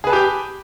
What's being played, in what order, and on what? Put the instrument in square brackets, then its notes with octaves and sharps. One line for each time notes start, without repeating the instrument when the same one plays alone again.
[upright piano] G#4
B4
A5
G4
G5